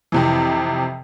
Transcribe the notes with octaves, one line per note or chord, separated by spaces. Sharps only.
F2 C3 E3